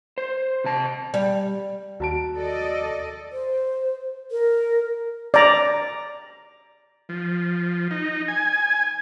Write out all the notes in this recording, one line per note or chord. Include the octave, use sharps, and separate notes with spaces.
C5
C3 A5
G3
D#2 F#4 A5 D7
A4 D5 D#5
C5
A#4
D5 A#5
F3
D#4
G#5